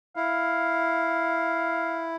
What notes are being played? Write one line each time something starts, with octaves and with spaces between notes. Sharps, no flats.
E4 F5